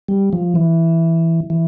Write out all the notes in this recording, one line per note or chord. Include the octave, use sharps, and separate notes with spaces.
G3
F3
E3
E3